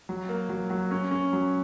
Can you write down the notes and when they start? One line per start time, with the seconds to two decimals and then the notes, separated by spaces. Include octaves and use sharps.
0.09 F#3
0.29 A#3
0.49 F#3
0.70 F#3
0.91 C#4
1.11 C#4
1.33 F#3